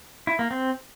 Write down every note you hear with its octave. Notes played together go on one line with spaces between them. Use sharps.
E4
A#3
C4